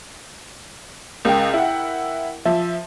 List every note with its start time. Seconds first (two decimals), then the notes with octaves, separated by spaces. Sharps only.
1.25 C#2 A#4 G5
1.53 E4 F#5
2.45 F3 E5